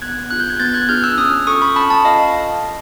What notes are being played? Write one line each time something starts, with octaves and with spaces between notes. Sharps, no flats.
B3 F#6 G#6
D4 F4 G#4 F#6
G6
G#6
B3 G6 A6
F#6 G#6
D4 F4 G#4 F6 G6
E6 F#6
C#4 D#6 F6
F4 A4 C#6 D#6
B5 C#6
C#4 A5 B5
A5 B5
F4 A4 D#5 F5